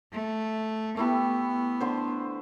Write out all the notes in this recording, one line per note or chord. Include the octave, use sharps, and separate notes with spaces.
A3
A3 B3 E4 G4
D3 C5